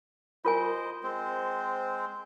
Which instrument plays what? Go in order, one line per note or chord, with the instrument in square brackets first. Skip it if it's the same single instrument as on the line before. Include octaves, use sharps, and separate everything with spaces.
[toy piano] F4 A#4 G#5 [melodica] C5 D#5
[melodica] G#3 C4 C5